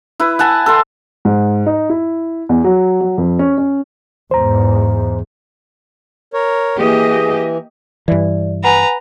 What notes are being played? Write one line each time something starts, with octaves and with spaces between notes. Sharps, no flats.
E4 B4
F#5 G#5 A5
A4 C6
G#2
D#4
E4
E2
F#3
F#3
F2
C#4
C#4
E2 G#2 C5 A#5
A#4 C#5
E3 A#3 G4 G#4 D#5
G2 E3 D5
B4 F#5 G#5 A#5